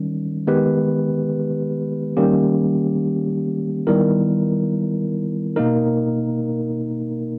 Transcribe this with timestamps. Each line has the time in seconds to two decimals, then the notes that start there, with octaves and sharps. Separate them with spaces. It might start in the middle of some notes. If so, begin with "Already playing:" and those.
Already playing: D#3 G3 C#4
0.47 D#3 G#3 B3 G4 B4
2.17 D#3 G3 A#3 C#4 G4
3.87 D#3 G3 B3 E4 A#4
5.56 B2 A#3 D#4 A#4